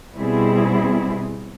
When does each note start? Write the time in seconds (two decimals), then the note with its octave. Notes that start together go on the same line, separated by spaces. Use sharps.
0.16 B2 G3 C4 E4 G#4